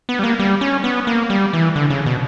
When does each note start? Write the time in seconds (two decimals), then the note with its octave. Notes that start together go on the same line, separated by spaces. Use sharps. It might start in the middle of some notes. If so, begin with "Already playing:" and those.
0.09 B3
0.19 G3
0.24 A#3
0.39 G3
0.61 C#4
0.84 B3
1.07 A#3
1.30 G3
1.53 E3
1.76 D3
1.90 C#3
2.06 B2